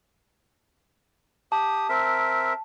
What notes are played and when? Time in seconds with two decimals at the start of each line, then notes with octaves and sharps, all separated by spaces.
1.52 G4 A5 D#6
1.89 C4 A#4 E5